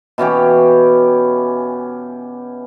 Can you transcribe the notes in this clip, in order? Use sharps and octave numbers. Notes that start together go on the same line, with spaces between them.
B2 E3 C#4 G4